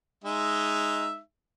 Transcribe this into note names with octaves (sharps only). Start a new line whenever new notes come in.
G#3 D#4 E5